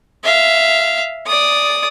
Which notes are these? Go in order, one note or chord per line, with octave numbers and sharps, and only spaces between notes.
E5 F5
D5 D#6